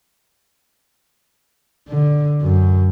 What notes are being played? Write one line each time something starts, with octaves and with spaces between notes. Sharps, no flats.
D3
F#2